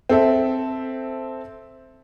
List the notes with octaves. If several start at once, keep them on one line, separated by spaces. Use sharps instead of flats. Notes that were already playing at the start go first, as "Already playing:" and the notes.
C4 A4 E5